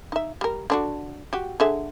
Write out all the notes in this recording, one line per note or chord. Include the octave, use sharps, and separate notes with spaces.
D#4 E5
G3 A#4
D3 D4 F#4
F#4 G4
D3 G#4 E5